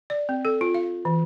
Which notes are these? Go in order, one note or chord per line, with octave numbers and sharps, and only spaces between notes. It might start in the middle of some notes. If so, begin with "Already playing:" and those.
D5
C4
A4
F4
F5
E3